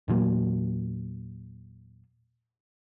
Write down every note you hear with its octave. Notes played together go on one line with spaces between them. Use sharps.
E2 A#2 F#3 A#3